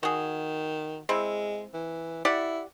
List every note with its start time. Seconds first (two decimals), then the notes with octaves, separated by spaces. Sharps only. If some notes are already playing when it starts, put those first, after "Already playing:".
0.03 D#3 F#4 G#4
1.09 G#3 C4 E4
1.74 E3
2.25 E4 G4 D5 F#5